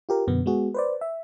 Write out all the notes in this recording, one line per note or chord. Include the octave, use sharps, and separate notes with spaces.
F4 G4 A#4
F#2 B2 D3 B3
G#3 B3 F#4 G#4
B4 C5 D5
E5